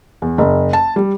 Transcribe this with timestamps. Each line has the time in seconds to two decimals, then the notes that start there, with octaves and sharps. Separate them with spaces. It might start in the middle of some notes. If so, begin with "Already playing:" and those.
0.22 E2
0.38 F#1
0.73 A5
0.96 G3